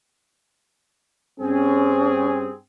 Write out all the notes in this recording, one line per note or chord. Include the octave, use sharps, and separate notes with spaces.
G2 C4 C#4 G#4